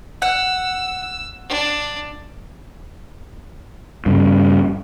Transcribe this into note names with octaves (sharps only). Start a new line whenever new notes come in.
F#5 E6
D4
G2 C#3